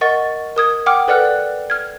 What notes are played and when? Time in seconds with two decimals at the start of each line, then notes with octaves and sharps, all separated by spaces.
0.01 A#4 D#5 F#5 C#6 A6
0.56 A#4 D#6 G#6
0.86 F#5 G5 D6 F6
1.08 A4 B4 D5 F#5 F6 F#6
1.25 D5
1.70 F6 G#6